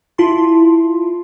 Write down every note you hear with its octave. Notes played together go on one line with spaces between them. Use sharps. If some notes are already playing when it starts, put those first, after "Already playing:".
E4 F4 A5 C6